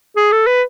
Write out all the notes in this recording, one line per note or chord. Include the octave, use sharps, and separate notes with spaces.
G#4
A4
B4